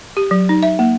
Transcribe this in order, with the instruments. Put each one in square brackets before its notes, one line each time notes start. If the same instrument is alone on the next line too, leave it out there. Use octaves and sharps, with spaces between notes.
[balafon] G4
F#3
D#4
E5
A#3